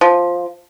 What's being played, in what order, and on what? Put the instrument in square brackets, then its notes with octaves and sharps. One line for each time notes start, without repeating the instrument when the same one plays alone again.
[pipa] F3